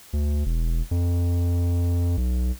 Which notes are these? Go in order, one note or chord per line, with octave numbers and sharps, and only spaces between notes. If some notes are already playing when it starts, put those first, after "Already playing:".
D2
E1
F2
B1